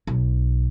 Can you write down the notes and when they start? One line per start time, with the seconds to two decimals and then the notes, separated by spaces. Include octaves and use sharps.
0.07 B1